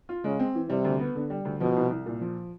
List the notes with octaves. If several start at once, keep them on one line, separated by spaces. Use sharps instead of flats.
F4
C#3 G#3
C4
E3
C3 G3
D2
B3
D3
G3
D2
B2 F3
C2
C2
A#2
F3